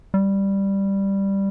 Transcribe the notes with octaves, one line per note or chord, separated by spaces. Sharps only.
G3